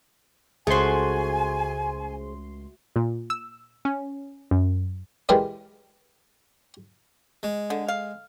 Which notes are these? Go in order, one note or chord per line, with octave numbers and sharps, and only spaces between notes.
C#2 A3 F#4 G#4 C5 G#5 C6
A#2
E6
C#4
F#2
E3 G#3 G4 A#4 B4 D5
G#3
D3
F5